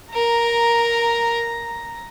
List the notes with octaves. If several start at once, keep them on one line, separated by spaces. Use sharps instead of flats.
A#4 A#5